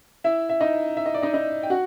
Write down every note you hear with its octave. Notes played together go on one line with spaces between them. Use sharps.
E4 E5
E5
D#4 D#5
E5
D#5
D5
D#4 D#5
D#4 D#5
G5
F#4 F#5